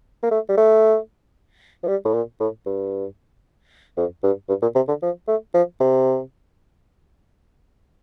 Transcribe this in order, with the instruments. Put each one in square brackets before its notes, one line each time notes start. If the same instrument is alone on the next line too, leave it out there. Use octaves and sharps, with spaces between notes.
[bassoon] A#3
A3
G3
A3
F3
G3
A2
A#2
A2
G2
F2
G2
G2
A#2
C3
D3
F3
A3
F3
C3